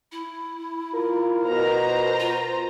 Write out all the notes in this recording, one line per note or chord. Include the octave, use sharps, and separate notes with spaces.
E4
F4 A#4
B2 C5 A#5
F4